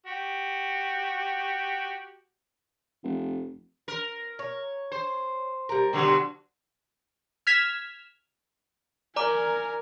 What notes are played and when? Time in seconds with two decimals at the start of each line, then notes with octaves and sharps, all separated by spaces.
0.06 F#4 G4
3.04 F1
3.88 A#4
4.39 C#5
4.92 C5
5.69 G3 A#4
5.93 B2 D3 F#3
7.47 F6 G#6 B6 E7
9.16 A#4 D5 G#5 A#5 D6